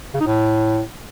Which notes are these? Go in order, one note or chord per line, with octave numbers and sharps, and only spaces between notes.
C#3
D#4
A2